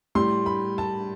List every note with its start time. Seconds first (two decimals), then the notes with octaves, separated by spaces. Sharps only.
0.15 A2 G3 C6
0.46 B5
0.78 A5